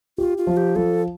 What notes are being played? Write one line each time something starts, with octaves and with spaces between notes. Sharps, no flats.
F4 G4
F4
F3
G4
F3 A4